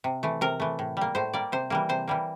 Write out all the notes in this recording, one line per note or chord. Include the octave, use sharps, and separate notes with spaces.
C3
E3 A3
C3 A#4
E3 A3
A2
G3 A#3
A2 C5
G3 A#3 D5
C3 C5
E3 G3 A#3
C3 C5
E3 G3 A#3